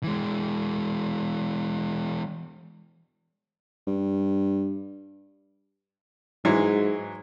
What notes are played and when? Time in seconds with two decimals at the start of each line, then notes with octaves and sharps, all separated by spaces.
0.03 E3 G#3
3.87 G2
6.45 G#2 E3 F#3 G#3